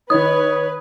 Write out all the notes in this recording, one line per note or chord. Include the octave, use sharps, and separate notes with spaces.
D#3 D#4 B4 C#5 D#6